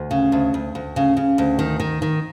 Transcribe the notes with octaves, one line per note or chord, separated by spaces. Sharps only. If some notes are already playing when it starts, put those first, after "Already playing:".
Already playing: D2
C#3
D2
D2
D2
C#3
C#3
D2
D#3
D#3
D#3